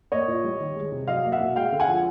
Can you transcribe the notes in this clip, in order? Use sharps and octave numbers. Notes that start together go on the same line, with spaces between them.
A#3 C#5 D#5
A#2
G3
D#3
G#3
C3
F#3 D#5 F5
A#3
E5 F#5
B2
G#3 F5 G5
D3
F#5 G#5
F3